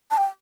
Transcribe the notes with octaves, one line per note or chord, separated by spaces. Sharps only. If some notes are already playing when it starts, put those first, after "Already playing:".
A5
G5